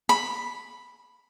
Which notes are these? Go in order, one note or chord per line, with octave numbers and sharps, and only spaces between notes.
B5